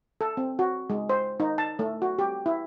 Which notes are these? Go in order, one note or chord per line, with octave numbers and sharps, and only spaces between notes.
A4
C4
F#4
G#3
C5
D#4
A5
A3
F#4
G4
E4